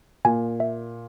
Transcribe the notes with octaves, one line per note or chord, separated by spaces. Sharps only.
A#2 G#5
E5